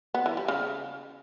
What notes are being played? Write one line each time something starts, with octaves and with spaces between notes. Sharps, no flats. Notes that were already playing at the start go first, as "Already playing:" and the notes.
B3
E3
G3
C#3